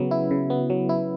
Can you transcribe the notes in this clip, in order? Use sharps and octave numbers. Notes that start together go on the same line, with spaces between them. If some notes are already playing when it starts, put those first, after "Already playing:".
Already playing: C#3 F#3 B3
E4
C#3
B3
F#3
E4